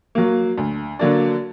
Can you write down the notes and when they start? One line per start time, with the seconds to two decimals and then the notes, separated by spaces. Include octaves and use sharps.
0.15 F#3 A#3
0.58 D2
0.99 D3 F#3 A#3 D4